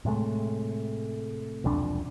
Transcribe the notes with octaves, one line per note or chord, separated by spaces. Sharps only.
A2 C3 G#3 A3
E1 C2 F2 D4